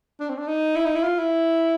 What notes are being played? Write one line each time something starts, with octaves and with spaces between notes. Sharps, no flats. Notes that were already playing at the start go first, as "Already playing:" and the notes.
D4
C4
D4
D#4
E4
D#4
E4
F4
E4